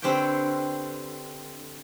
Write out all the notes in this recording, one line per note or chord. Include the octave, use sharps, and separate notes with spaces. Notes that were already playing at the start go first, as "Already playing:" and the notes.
D3 C4 G4 B4 C#5 G5